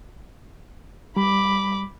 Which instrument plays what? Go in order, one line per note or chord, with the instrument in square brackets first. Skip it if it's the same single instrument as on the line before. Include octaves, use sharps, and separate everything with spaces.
[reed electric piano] G3 [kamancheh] B5 D6